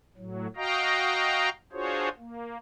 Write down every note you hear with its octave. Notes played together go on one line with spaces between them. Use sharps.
A2 F#3
F#4 D#5 F5 G5 A#5
D4 F4 F#4 G#4 C5 C#5
A#3